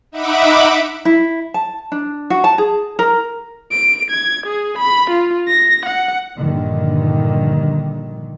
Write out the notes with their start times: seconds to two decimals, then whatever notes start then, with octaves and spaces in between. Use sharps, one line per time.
0.11 D#4 E5 F#5 B5 D6
1.05 E4
1.54 A5
1.92 D4
2.30 F#4
2.44 A5
2.58 G#4
2.99 A#4
3.72 D7
4.11 G#6
4.47 G#4
4.79 B5
5.11 F4
5.47 A#6
5.86 F#5
6.38 A#1 G2 D3 D#3